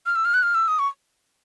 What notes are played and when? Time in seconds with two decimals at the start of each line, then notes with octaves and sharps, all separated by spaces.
0.06 F6
0.15 E6
0.25 F6
0.34 F#6
0.43 F6
0.55 E6
0.68 D#6
0.79 C#6